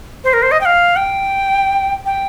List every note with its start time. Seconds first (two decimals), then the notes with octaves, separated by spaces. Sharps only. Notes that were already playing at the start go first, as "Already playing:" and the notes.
0.24 C5
0.33 A#4
0.42 C5
0.51 D#5
0.61 G5
0.65 F5
0.96 G5
2.06 G5